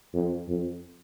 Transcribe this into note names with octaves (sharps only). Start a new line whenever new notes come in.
F2
F2